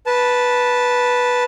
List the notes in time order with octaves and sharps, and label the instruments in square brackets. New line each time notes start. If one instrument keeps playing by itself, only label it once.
[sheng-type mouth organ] B4 A5